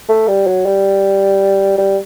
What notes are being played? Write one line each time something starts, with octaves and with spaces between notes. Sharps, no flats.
A3
G3
F#3
G3
G3